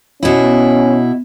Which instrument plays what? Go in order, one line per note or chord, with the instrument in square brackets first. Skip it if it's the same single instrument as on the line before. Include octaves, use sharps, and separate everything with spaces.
[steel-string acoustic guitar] B2 E4 [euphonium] C#4